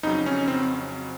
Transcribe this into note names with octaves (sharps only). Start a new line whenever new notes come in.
F2 C#3 F#3 D#4
C#4
C4